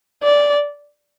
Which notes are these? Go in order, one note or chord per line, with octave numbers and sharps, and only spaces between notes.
D5